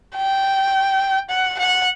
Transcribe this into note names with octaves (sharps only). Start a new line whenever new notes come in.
G5
F#5
F#5